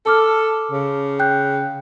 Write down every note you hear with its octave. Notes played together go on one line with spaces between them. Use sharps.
A4 A5 D6 F6
C#3
G5 F#6 G6